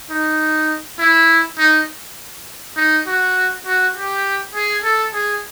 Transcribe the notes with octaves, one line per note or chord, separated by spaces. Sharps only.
D#4
E4
D#4
D#4
F#4
F#4
G4
G#4
A4
G#4